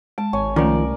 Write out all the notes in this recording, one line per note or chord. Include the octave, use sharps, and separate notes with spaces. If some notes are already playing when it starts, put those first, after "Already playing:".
G#3 A5
G#1 C#5 G#5
C2 D#3 F3 A3 C#4 A#4 D5